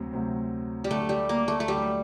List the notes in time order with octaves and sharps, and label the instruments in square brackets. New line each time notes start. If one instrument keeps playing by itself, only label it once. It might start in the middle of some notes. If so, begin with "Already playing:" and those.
Already playing: [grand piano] D2 C3 F#3 C4
D2 C3 F#3 C4
[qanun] G3
[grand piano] D2 D3 F#3 [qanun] A3
[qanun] G3
A#3
A3
A3
[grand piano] D2 D3 F#3 [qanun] G3